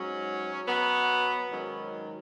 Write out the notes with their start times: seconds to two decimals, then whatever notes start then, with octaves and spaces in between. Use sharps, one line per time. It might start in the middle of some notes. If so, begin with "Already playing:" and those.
Already playing: G#2 F#3 C#4
0.68 B2 F#3 B3
1.50 G#2 D#3 F#3 C#4